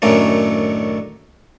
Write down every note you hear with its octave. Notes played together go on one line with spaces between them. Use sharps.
F#2 A2 D#3 A3 C#4 D4